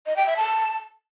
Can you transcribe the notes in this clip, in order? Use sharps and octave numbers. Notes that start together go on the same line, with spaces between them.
D#5
G5
E5
A5